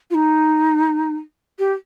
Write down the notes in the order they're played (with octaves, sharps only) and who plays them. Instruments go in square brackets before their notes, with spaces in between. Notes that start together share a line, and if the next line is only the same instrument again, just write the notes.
[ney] F4
D#4
G4